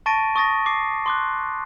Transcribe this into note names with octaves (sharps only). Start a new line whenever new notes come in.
A5 C#6 A6 A#6 D7 D#7
C#6 D#6 A6 A#6
D6 C7
C6 D6 F#6